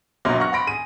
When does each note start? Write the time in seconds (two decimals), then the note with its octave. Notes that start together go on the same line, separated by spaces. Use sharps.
0.25 E1 A#1 F#3 A#3 A#4 C6
0.40 F#5 C#6 F6 A#6
0.52 F#5 B5 C6 A#6 D7
0.67 G#4 D#7